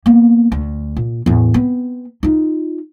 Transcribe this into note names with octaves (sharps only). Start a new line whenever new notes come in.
A#3 B3
D2
A#2
E2 A2
B3 C4
D#4 F4